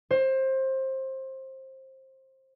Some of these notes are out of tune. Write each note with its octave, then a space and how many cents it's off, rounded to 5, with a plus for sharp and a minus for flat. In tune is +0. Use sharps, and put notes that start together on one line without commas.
C5 +20